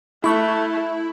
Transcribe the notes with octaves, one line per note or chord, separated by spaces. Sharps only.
A3 E4 B5 C#6 F#6